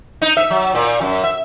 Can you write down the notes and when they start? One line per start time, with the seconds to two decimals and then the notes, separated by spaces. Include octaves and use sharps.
0.22 D#4
0.37 E5
0.50 F#3
0.75 A#2
1.01 F#2
1.24 E5